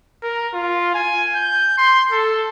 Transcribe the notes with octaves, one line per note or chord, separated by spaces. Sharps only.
A#4
F4
G#5
G6
C6
A4